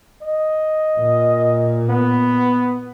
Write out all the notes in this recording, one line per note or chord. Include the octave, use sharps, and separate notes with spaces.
D#5
A#2
B3